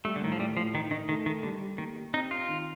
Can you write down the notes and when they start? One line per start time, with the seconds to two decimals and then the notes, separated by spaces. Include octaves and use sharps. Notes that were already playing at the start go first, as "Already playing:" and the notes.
0.05 G3 A3
0.16 D3
0.22 A2 D#3
0.32 F3
0.39 A2 G3
0.57 A2 F3
0.74 D#3 D#4
0.91 D#3 D#4
1.09 D#3 A3
1.26 D#3 A3
1.43 D3 G3
1.62 G4
1.78 D#3 A#3
1.96 G4
2.14 C4 D#4
2.31 C4 F4
2.48 D#3